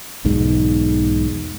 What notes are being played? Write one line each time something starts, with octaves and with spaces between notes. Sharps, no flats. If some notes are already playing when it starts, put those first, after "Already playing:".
B1 E2 G#2